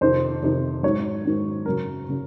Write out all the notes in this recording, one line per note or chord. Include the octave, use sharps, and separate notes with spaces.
F2 C3 D#3 C5
F2 C3 D#3
G#2 D#3 F#3 C#5
G#2 D#3 F#3
F#2 C#3 F#3 A#4
C#3 F#3